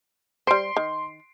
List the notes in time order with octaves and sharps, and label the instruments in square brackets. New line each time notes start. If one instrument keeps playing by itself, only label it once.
[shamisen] G3 C5 [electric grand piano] C6 C7 D7
[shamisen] D#3